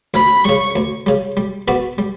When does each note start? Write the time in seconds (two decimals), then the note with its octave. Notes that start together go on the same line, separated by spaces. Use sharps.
0.14 D2 B5
0.45 C#3 G3 C#6
0.76 D2
1.06 C#3 G3
1.37 G3
1.68 B3 F#4 B4 D5
1.98 G3